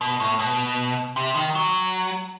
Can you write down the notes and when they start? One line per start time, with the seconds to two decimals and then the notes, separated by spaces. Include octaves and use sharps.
0.01 B2
0.20 A2
0.39 B2
1.16 C3
1.35 D#3
1.55 F#3